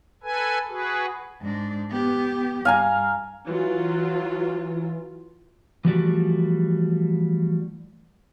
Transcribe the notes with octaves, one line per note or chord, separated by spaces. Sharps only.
A4 B4 G#5
F#4 G#4 B4
G#2 D4
B3 G4
G2 F5 G#5 A#5
E3 F#3 F4
E3 F3 G3 A3 F#4 D5